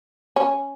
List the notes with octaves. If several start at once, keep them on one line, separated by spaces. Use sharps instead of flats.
C#4